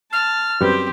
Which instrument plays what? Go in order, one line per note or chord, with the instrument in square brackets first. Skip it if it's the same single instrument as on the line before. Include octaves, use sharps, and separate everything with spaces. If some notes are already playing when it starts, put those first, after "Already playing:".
[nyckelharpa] A5 [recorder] F6
[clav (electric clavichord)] F#2 G3 B4 [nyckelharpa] C4 G4